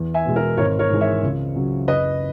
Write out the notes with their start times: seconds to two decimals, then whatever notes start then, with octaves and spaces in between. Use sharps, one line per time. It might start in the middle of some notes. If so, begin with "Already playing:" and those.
Already playing: E2
0.14 E5 G#5
0.25 B2 G#3
0.36 A#4
0.57 G#1 A#4 C#5
0.79 A#4 C#5
0.90 G#2 E3 G#3
1.01 C#5 E5
1.23 C#2
1.55 C#3 F#3
1.87 F#1 B4 D#5